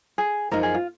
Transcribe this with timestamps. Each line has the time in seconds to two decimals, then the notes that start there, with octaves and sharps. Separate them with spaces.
0.18 G#4
0.51 F#2 F3 A#3 D#4 A#4
0.63 G#4
0.74 F4